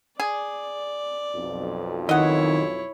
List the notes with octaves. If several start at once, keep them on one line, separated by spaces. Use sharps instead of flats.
G#4 D5
B1 F2
D#3 E4 C#5 D#5 F#5